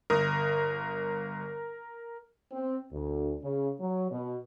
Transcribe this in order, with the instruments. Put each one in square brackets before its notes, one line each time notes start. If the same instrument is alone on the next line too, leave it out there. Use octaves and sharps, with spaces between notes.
[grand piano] G1 D#6 [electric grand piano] A#4
[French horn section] C4
D2
C#3
F#3
B2